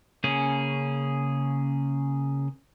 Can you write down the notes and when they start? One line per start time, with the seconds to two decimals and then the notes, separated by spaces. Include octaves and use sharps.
0.24 C#3 A#3 C#4 G#4